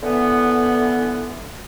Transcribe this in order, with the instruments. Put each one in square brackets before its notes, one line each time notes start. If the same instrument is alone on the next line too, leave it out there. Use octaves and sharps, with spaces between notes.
[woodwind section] D3 E3 B3